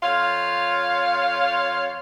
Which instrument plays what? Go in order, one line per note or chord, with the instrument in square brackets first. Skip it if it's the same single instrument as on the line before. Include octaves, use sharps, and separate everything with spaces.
[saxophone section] F2 F4 C#5 F5